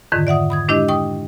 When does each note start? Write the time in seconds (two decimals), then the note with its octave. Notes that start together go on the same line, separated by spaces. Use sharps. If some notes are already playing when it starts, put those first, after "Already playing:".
0.12 F2 G#2 D3 D#3
0.27 D5 E5 F#5 D#6
0.50 B5 D#6 G#6
0.68 G#3 D4 E4 G4 D#5
0.88 G5 C#6 D#6